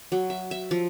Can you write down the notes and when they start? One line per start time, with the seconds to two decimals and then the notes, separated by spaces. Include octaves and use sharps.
0.12 F#3
0.30 E5
0.51 E5
0.71 F3